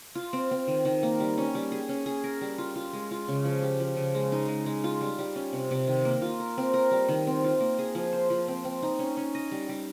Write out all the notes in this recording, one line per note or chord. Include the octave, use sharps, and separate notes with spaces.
F4
C4
C4
D#3
D#3
A#3
G3
C#4
G3
G#4
C#4
G#4
A#4
G3
F4
F4
G#3
F4
C#3
F3
G4
F3
C#3
G#3
D#4
G#3
G#3
F4
G3
G3
C#4
C3
C3
D#3
A#3
F4
A#4
C4
A#4
G3
D#3
C4
F4
A#3
G#4
F3
C5
F3
C4
C4
D#4
C#4
C#4
D#5
G3
G3